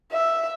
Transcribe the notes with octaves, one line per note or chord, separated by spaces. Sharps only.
E5